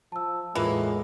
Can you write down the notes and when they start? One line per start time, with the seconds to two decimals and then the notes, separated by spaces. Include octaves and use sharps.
0.12 F3 A5 E6
0.55 E2 A2 E3 G#3 A#3 F4